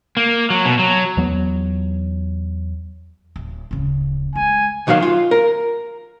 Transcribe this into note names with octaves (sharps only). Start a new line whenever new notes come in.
A#3
F#3
B2
F#3
E2 F#3 B3
D1
D1 C#3
G#3 G#5
B1 D#3 F#3 C#5 F5
F4
A#4